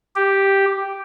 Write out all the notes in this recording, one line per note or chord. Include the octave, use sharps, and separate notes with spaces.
G4